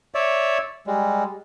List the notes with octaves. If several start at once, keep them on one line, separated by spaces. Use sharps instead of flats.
C#5 D5 E5
G3 G#3